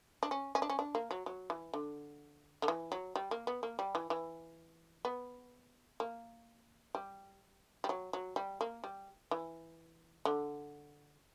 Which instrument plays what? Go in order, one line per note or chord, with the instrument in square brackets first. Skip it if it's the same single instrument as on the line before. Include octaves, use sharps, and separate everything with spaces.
[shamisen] D4
C#4
C#4
D4
C#4
D4
A#3
F#3
F#3
E3
D3
D3
E3
F#3
G3
A#3
B3
A#3
G3
E3
E3
B3
A#3
G3
G3
F#3
F#3
G3
A#3
G3
E3
D3